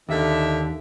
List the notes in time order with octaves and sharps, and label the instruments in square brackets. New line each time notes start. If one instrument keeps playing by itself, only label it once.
[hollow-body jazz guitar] D#2 [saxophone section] D3 D#3 E5